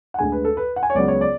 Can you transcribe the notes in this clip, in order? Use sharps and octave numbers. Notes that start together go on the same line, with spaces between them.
F#5
D2 D3 G#3 G#5
B4
A4
B4
F#5
G#5
C#5
C#2 C#3 F#3 B3 D5
C#5
D5